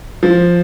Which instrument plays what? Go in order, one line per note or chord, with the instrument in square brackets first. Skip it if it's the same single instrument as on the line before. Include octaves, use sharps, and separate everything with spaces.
[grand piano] F3